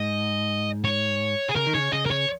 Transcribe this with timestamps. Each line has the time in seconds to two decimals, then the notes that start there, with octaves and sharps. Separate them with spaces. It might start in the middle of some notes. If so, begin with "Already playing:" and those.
Already playing: G#2 D#5
0.84 C#5
1.49 G#4
1.56 C#3 A#4
1.67 D#3
1.74 C#3 C#5
1.92 C#3 D#5
2.06 A#4
2.11 C#5